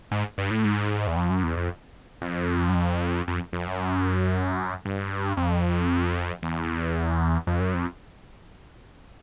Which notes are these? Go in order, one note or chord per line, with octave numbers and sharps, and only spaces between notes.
G#2
G2
A2
G#2
E2
F2
F#2
E2
F2
F2
F#2
F2
F2
F2
F#2
G2
F2
E2
F2
F#2
F2